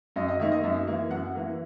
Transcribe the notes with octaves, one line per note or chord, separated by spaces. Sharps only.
F#2 D#5
D#5
D#3 A#3 D#4 E5
D#5
F#2 E5
E3 A#3
F#2 F#5
E3 A#3